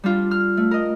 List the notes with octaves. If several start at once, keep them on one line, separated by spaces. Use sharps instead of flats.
G3 D4 F4
F6
A3
A#4 D#5